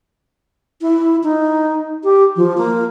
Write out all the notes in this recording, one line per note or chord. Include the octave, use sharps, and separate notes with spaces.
E4
D#4
G4
F3
A#3